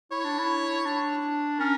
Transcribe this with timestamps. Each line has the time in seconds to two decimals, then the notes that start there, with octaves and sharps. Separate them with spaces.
0.11 E4 C#5
0.24 D4
0.38 E4
0.85 D4
1.59 C#4 A#4